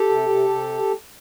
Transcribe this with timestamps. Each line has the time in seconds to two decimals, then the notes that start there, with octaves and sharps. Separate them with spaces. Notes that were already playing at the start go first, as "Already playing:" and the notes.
Already playing: G4 A4
0.09 C3
0.29 C3
0.49 C3